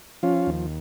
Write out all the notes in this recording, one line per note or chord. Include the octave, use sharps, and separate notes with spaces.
F3 C#4 F4
D#2